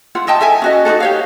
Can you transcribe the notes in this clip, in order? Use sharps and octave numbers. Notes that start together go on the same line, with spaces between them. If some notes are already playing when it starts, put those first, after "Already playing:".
E4 F4 F#5
E4 D#5 G5 A5
A4 E5 G#5 A5
C#4 F#4 D#5
D#4 F4 F#4 A4
G4 C#5 F5